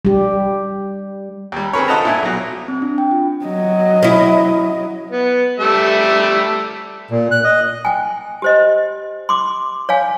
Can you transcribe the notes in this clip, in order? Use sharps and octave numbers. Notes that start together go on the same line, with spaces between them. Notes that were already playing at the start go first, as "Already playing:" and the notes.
G3 G4
D#2 G3
C4 G#4 A#4 B4 C#5
F4 A4 D#5 F#5 A5 A#5
A#2 E4 G#5
B1 F#3
C4
D4
G5
F4
F#3 D#5
C#4 E4
B3
G3 A3 E5
A#2
F#6
D#5
G5 G#5
G4 C5 D#5
C6 D6
C#5 F5 G#5